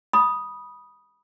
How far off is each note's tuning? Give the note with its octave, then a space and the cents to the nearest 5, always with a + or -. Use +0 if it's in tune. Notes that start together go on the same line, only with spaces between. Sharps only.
B5 -20 D#6 +0